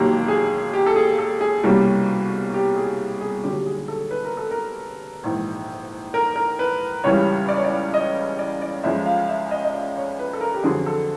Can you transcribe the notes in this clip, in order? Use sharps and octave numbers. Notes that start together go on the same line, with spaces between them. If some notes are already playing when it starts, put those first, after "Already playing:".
Already playing: E1 D#2 D#3 F#3 A#3 G4
G#4
G4
A4
G#4
A4
G#4
C2 B2 G3 A#3 C#4 G4
G4
G#4
G#4
D#2 D3 F#3 G4
G#4
A4
B4
A#4
A4
A#4
A#1 G#2 E3
A#4
A#4
B4
C#2 C#3 E3 G3 C#5
D5
C#5
D5
D#5
D5
D5
C#2 C#3 F3 G#3 E5
F5
E5
D#5
D#5
D5
C#5
B4
A4
A#4
G4
F2 D3 F#3 G#4
A4